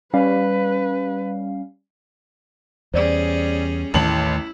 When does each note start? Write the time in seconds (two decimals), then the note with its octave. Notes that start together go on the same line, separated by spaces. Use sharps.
0.14 G3 C#4 B4 F5
2.94 E2 G3 C#4 G#4 C5 D5
3.94 A1 D#2 D#3 A3 E4 A5 F#7